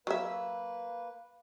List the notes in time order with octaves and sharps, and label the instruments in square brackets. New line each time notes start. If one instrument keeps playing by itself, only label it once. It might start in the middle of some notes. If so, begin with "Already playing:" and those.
[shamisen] F#3 E5 [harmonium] A#3 B4